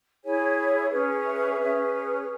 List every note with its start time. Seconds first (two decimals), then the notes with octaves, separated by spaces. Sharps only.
0.22 E4 G#4 C#5 G#5
0.90 C#4 G#4 B4
1.24 E5
1.57 C#4 G#4 B4